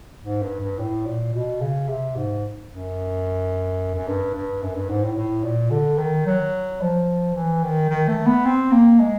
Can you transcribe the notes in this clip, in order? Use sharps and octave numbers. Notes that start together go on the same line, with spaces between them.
G#2
G2
G2
A2
A#2
B2
C#3
C3
G#2
F#2
F#2
G2
G2
F#2
G2
G#2
A2
A2
A#2
D3
D#3
F#3
F3
E3
D#3
D#3
A3
B3
C4
A#3
G#3